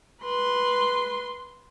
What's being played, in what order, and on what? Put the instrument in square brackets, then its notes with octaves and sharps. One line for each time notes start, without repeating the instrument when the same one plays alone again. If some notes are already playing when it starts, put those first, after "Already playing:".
[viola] B4 C6